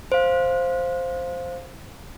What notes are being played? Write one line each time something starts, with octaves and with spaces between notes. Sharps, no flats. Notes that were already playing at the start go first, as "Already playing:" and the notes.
C5 F5